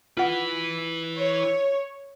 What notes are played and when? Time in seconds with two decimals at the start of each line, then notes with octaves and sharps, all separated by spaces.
0.17 E4 F4 B4 F#5
1.17 C#5